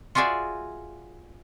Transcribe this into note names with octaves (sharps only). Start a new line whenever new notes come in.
F4 F#4 G#4 D5 E5